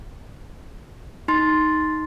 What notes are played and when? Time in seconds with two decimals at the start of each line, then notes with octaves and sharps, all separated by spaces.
1.28 D#4 C6 A6